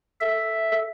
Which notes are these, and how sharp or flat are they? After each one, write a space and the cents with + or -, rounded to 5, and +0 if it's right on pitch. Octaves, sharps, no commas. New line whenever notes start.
A4 +0 E5 +0